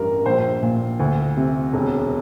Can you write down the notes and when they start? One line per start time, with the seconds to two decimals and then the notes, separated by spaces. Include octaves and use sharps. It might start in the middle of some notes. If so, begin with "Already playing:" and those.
Already playing: A1 G2 A#4
0.26 A#1 C5
0.62 A#2
1.00 D2
1.37 C3
1.73 E1